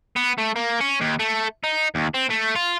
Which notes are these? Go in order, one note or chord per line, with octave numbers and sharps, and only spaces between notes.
B3
A3
A#3
C#4
D#2
A3
D#4
D#2
C4
A3
F4